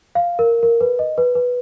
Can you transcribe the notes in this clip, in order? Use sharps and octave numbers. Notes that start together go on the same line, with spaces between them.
F5
A#4
A#4
B4
D#5
B4
B4